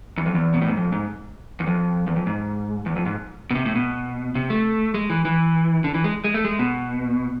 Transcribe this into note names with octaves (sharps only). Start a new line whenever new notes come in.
E2
F2
E2
B2
A2
G#2
F2
G#2
E2
F2
E2
F2
G#2
E2
F2
G#2
B2
C3
A2
B2
C3
A3
G#3
E3
E3
D3
E3
G#3
G#3
A3
G#3
B2